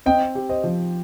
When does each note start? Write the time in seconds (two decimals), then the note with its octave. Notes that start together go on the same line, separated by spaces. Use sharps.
0.06 C4 D#5 G5
0.35 G4
0.49 C5 D#5
0.64 F3